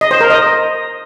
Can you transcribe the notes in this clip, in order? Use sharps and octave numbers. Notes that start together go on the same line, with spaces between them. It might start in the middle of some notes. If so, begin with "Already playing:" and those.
D#5
C5
A#4
D#5